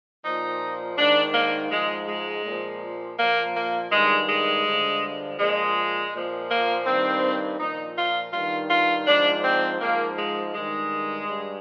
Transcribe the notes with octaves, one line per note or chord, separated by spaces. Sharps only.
A#2 F3 D#4
G#2 D#3 D4
A#3
G#2 F3 G#3
G#3
A#2 F3
A#2 F3 A#3
A#3
G2 D#3 G#3
G#3
G2 D3 F3
A#2 F3 G#3
A#2 F3
A#3
G2 D#3 C4
A#2 F3 D#4
F4
G2 D#3 F4
F4
G#2 F3 D4
C4
G#2 F3 A#3
G#3
G2 D#3 G#3
G2